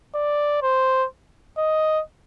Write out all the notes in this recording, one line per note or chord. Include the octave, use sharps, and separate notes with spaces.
D5
C5
D#5